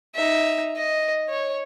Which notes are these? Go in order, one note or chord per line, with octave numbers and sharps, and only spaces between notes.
D#4 E5
D#5
C#5